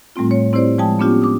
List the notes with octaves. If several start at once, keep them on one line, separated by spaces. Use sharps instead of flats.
A2 G3 A3 C4 F4
C#5
C4 E4 G4 C5 D5
F3 G#3 G5 A5 D#6
B3 C#4 D4 F4 G4
D6 D#6